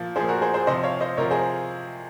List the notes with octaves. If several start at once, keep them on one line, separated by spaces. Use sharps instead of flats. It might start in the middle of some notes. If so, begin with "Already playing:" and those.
Already playing: A#2 F3
F3 G#4 C5
A#2
F#4 A#4
G#4 C5
G#4 C5
C3 F3 C5 D#5
C#5 F5
C5 D#5
C3 F3 A#4 C#5
G#4 C5